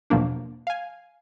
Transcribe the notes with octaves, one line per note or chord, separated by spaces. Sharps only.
E2 B2 F3 F#3 A#3 D4
F5 G#5